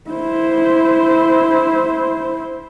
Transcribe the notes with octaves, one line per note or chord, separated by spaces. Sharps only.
E4 C5